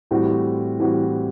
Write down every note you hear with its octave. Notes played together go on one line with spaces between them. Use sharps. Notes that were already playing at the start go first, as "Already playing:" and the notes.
A2 E3 G3 C4 F#4
A2 E3 G3 C4 F#4